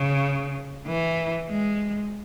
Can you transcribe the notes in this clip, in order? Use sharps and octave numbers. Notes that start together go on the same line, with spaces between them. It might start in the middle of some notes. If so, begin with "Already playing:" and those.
Already playing: C#3
E3
G#3